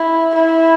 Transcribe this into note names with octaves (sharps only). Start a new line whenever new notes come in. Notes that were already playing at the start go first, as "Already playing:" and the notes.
Already playing: E4
E4